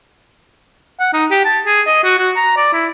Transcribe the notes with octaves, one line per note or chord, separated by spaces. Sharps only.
F#5
D#4
G4
A5
G#4
D#5
F#4
F#4
A#5
D5
E4